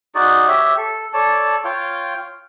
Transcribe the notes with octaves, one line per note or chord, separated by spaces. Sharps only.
D#4 F#4 G#4 D5
G4 C#5 E5
A4
A4 C#5 D5 A5
F4 C#5 F5 G5